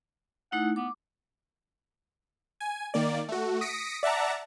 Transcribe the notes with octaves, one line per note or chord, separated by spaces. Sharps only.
A3 D#4 E4 F#5
B3 D6
G#5
D#3 A#3 D5
A3 F#4
D#6 A#6 B6 C#7 D7
D5 E5 F#5 A5 A#5